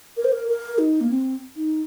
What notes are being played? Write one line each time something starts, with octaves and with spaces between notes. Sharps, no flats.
A#4
C5
A#4
A#4
D#4
A#3
C4
D#4